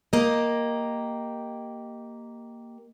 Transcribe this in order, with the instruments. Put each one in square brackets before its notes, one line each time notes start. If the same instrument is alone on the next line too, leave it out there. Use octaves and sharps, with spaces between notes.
[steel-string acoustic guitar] A#3 G4 D#5